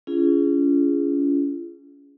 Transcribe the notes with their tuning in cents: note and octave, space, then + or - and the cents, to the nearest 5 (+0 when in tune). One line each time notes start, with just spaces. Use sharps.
C#4 +30 F4 -40 G#4 +0